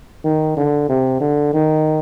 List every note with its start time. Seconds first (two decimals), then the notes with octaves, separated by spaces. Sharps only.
0.25 D#3
0.57 D3
0.89 C3
1.20 D3
1.54 D#3